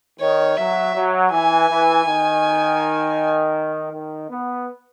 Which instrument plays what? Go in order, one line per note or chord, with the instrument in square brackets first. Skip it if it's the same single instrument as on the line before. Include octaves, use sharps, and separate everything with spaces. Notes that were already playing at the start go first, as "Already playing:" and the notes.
[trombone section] D#3 [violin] C#5
[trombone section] F#3 [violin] E5
[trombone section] F#3
[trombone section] E3 [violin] G#5
[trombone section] E3
D#3
D#3
B3